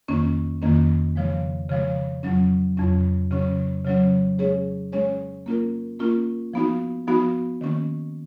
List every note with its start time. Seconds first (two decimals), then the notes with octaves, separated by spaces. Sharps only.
0.08 F2 D#3 A#3 C#4
0.62 F2 D#3 A#3 C#4
1.16 C#3 F3 G#3
1.70 C#3 F3 G#3
2.23 F2 C#3 F#3 C#4
2.77 F2 C#3 F#3 C#4
3.31 C#3 F#3 C#4
3.85 C#3 F#3 C#4
4.38 G#3 C#4 G#4 C#5
4.92 G#3 C#4 G#4 C#5
5.46 A#3 C#4 F4 A#4
6.00 A#3 C#4 F4 A#4
6.54 F3 B3 D#4 F#4
7.07 F3 B3 D#4 F#4
7.61 D#3 A#3 C#4